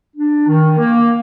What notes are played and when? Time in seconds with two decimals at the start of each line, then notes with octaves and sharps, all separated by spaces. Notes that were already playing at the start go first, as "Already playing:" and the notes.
0.17 D4
0.47 D#3
0.78 A#3